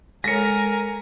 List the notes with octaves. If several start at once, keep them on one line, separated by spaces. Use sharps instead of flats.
G#3 A4 A#4 C#5 G#5 A#6 C#7